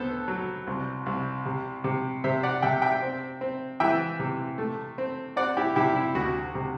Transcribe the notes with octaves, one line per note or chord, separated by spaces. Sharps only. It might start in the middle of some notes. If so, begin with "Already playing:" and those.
Already playing: D2 B3 A4 C5
F#3
C2
C2
C3
C3
C3 C5 E5
D5 F#5
C3 E5 G5
E5 G5
C4
C4
E3 E5 G5
C3
A3
C4
C4 D5 F#5
E4 G4
C3 E4 G4
E4
D2 F#4
C3